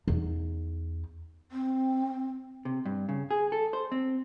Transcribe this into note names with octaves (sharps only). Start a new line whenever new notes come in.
E2 D#4
C4
C3
G2
C#3
G#4
A4
C5
C4